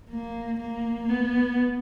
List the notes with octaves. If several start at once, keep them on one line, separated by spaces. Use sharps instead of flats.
A#3
A#3
B3